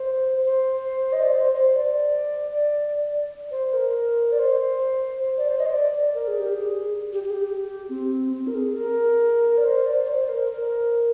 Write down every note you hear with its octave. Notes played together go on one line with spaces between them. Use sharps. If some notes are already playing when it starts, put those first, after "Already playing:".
Already playing: C5
C5
D#5
D5
C5
C5
D5
C5
A#4
D5
C5
D5
C5
D#5
C5
D5
A#4
G#4
G4
G#4
G4
G4
G#4
G4
C4
C4
A#4
G#4
A#4
D5
C5
D5
D5
C5
A#4
A#4